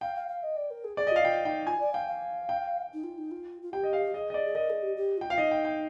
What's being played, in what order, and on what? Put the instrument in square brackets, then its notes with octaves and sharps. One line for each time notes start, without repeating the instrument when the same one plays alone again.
[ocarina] F5 [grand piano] G5
[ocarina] F5
F5
D#5
D5
A#4
G#4
[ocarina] G#4 [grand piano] D5
[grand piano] D#5
[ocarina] F4
[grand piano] F5
[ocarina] F4 [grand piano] G5
[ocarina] D#4 [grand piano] G5
[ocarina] F4 [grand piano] G#5
[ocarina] D5
[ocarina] F5 [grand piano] G5
[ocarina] F5
[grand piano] G5
[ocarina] D#4
F4
D#4
F4
F4
[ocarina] G4 [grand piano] G5
[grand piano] D#5
F5
[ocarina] G#4 [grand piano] D#5
[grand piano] D#5
D5
[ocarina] G#4
[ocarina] A#4 [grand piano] D#5
[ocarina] G#4
G4
G4
[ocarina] F4 [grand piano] G5
[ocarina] F4 [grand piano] F5
[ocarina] D#4 [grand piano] D#5
[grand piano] G5
G5